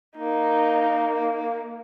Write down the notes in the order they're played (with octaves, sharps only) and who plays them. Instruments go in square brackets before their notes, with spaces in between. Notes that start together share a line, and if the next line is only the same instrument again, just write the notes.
[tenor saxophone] A#3 [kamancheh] D#4